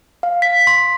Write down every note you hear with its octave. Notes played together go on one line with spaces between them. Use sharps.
F5
B6
C6